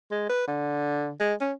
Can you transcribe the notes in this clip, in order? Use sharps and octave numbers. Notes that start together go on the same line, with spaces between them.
G#3
B4
D3
G#3
C#4